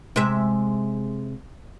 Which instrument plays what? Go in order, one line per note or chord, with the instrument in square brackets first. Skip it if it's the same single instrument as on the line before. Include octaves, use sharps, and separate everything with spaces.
[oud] C3 G#3 E5